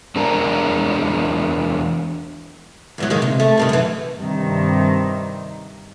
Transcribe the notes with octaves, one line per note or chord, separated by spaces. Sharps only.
E2 G#3 D4 A#4 A5 A#5
E2 G#2 F#3
D#3 G#3 A#3
C3
A3
G2 C3 D#3
F#2 E3
G2 C3 D#3